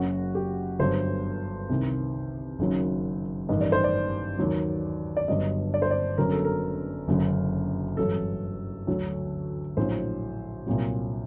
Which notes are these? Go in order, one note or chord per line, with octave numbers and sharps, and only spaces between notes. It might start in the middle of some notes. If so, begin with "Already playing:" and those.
Already playing: F#1 F#2 F#3 F#4
G4
G1 G2 D3 F#3 C5
C2 C3 D#3
F#1 F#2 D#3 F#3
A1 G2 D#3 D#5
D5
C5
D5
D#2 D#3 F#3
D5
G1 G2 F#3 D#5
D5
C5
D5
G1 F#2 D3 F#3 A#4
A4
A#4
F#1 F#2 D3 F#3
A1 G2 F#3 A4
D2 D3 F#3
A#1 A2 F#3 C5
C2 A#2 F#3